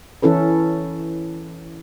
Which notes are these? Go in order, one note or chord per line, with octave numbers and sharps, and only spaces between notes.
E3 C#4 E4 A4 B4